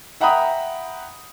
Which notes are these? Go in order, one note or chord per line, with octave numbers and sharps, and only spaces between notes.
E5 F#5 G5 A#5 B5 D#6